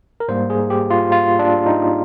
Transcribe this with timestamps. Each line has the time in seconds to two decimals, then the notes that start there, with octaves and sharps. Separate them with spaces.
0.20 A#4
0.28 G#2 G3 A#3 C5
0.50 G#4
0.70 G4
0.90 F4
1.12 F4
1.39 D4
1.66 D#4